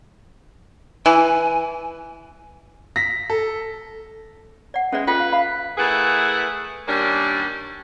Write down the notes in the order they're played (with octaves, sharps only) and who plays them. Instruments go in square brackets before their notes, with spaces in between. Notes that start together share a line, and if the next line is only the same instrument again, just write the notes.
[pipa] E3 [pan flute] G#5
[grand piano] A#6 B6
A4
[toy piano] D5 F#5
[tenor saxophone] G#3 [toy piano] C#4 D5 [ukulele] B4 E5
[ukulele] C#4 [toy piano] F4 A4 G5 [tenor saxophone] B4
[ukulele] F5
E5 F5 B5
[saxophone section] A3 E4 G#4 A#4 B4 F#5
D#3 G3 A#3 C#4 D4